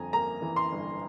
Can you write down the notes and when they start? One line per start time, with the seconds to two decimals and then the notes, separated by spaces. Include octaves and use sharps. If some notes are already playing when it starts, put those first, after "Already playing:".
Already playing: G1 F2 G#5 A#5
0.13 A#3 A#5
0.42 E3
0.56 C6
0.72 G1